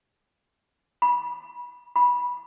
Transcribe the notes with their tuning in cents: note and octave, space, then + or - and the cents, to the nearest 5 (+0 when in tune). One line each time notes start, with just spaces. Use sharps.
B5 -25
B5 -15